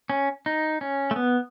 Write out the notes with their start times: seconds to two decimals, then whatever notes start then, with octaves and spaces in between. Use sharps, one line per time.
0.10 C#4
0.46 D#4
0.81 C#4
1.11 A3
1.16 B3